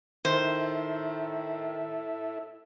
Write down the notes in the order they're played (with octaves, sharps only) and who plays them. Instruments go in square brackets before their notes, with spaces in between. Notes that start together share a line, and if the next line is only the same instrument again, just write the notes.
[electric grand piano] D#3 [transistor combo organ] E4 A4 E5 [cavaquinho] C5